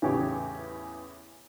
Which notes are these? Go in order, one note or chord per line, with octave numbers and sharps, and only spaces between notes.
E2 A2 C#3 E3 G4 C#5